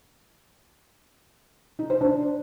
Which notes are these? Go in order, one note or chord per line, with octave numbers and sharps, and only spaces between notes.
D#4
C5
D4